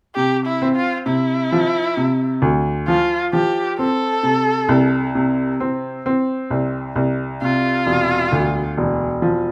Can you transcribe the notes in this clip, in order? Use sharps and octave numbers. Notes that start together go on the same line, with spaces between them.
C3 G4
E4
C4
F4
C3 E4
F3
C3
D2
F3 F4
F3 G4
C4 A4
C3
C2
C3
C4
C4
C2
C2
C3 F4
E1
D2
E1
F3